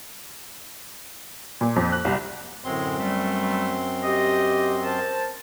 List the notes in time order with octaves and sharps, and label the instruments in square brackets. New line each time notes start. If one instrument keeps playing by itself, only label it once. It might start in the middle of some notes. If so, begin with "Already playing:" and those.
[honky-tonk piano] A#2
F2
F#6
C2
[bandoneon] F#2 C4 C6 [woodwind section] A2 D3 G#3
[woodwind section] G3 A3
G4 D#5
A#4 C5 A5